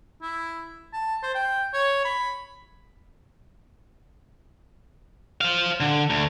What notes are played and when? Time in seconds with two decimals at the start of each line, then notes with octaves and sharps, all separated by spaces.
0.22 E4
0.93 A5
1.23 C5
1.35 G5
1.74 C#5
2.05 B5
5.41 C5 F5
5.80 D3
6.10 D2